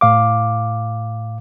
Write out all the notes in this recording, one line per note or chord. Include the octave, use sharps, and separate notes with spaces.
A2 F5 D6